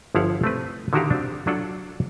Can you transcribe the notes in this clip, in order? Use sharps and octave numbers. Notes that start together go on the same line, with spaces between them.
G1 F3 E4 F5 F#5
A3 C4 B4
D3 D#3 E4 F#4 G4 F5
C4 D4
F#3 D4 F4 A4 F#5